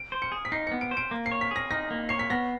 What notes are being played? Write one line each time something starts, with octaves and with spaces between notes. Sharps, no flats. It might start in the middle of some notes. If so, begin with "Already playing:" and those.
Already playing: D7
C5
C#7
G#4
B6
D#4 C7
B3 C#7
D7
C5
D7
A#3
C7
C#5
B6
G#4 A#6
D#4 A#6
A#3
C#5 C7
B6
B3 A#6